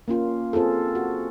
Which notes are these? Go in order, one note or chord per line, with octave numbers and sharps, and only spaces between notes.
A#3 C#4 F4
C4 F4 G#4 A4
F#4